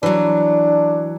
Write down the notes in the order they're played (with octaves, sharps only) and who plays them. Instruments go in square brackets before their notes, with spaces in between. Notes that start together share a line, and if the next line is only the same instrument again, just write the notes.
[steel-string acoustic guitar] E3 F#3 [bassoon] D4